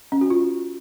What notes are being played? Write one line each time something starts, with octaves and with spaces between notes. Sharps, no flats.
C#4
F#4
F4